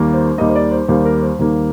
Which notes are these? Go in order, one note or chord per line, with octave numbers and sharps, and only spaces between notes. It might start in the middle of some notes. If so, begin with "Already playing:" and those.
Already playing: D#2 D#3 G3 A#3
C5
D#2 D#3 G3 A#3 D#5
C5
D5
C5
D#2 D#3 G3 A#3 C5
A#4
C5
D#2 D#3 G3 A#3